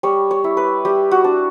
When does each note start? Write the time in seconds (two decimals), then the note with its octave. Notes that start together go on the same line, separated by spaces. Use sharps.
0.03 G3 C#5
0.31 C#5
0.44 E4
0.57 B4
0.85 G3 G4
1.11 F#4
1.24 D4